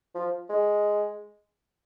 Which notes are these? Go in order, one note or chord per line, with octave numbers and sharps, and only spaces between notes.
F3
G#3